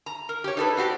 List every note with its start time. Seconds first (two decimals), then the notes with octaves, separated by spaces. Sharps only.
0.06 A#5
0.29 A#4
0.44 G4 C#5
0.57 D#4 A4 B4
0.77 C4 F#4 G4 D5